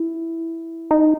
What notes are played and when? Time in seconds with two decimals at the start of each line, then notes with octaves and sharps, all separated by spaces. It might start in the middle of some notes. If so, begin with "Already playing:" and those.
Already playing: E4
0.91 D#4